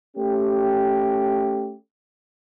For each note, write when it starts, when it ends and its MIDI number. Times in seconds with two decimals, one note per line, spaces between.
0.17 1.75 57
0.17 1.75 61
0.17 1.75 67